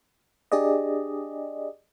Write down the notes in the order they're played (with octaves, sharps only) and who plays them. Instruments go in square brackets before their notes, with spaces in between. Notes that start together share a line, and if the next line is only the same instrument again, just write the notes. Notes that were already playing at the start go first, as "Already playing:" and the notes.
[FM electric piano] D4 G4 G#4 D5 D#5